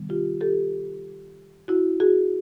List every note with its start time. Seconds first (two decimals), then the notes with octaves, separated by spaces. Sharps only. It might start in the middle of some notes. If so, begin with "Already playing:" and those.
Already playing: C3 D#3 G3 B3
0.09 F4 G4
0.41 G4 A4
1.68 E4 F#4
2.00 F#4 G#4